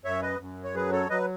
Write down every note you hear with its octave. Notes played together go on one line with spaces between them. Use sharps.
F#2 C#5 E5
B4 D#5
F#2
C#5
F#3 G#4 B4
A4 C#5
F#3 B4 D#5